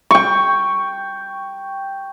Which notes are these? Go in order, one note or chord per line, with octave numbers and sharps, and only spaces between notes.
G5 C#6